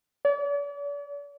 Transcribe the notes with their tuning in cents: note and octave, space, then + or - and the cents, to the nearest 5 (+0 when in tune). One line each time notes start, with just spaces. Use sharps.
D5 -45